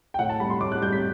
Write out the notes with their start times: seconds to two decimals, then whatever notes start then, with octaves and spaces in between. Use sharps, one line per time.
0.14 G5
0.19 A2 F#5
0.29 A5
0.40 G3 B5
0.50 C6
0.61 A2 D6
0.72 F#6
0.82 G3 G6
0.92 B6